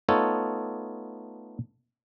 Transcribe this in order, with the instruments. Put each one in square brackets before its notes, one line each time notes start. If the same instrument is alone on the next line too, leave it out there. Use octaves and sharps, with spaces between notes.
[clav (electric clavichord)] A3 B3 D#4 F4 A4 C#5